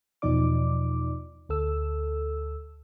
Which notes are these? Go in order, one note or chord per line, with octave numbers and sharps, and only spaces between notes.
E2 B2 F3 D#4 D5 D6
D2 A4 E6